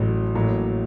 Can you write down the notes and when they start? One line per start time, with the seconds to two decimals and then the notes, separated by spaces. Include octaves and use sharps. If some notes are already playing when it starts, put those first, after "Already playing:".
Already playing: A1 A2 F#3
0.35 A1 A2 F#3 A#3